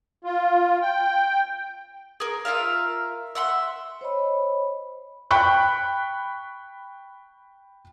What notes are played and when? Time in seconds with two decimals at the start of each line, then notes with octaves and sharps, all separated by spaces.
0.24 F4
0.82 G5
2.20 G#4 A#4
2.45 F4 A#4 E5 F5
3.35 E5 F#5 B5 C6
4.01 C5 C#5 D#5 B5
5.31 G5 B5 C#6 F#6